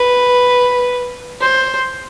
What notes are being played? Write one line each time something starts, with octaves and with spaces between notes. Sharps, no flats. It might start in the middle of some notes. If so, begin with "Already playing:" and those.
Already playing: B4
C5